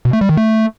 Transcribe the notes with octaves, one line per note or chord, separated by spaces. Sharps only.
B2
A3
G3
D#3
A3